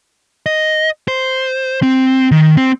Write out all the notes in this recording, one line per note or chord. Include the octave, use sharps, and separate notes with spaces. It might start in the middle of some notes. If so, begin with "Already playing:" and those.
D#5
C5
C4
D#3
C4